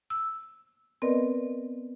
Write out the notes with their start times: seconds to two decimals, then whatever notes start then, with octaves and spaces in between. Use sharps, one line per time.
0.10 E6
1.02 B3 C4 A#4 B4 D5 D#5